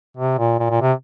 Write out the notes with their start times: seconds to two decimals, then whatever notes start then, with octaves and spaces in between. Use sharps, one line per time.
0.17 C3
0.39 A#2
0.59 A#2
0.70 A#2
0.81 C3